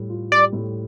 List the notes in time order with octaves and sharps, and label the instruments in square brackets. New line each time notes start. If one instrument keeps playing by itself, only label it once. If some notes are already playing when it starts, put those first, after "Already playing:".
Already playing: [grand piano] A2 G3
F4
[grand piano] G3 [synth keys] D5
[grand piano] A2